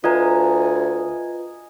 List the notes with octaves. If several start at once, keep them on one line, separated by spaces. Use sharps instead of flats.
D2 F4 B4 D#5 G#5 A#5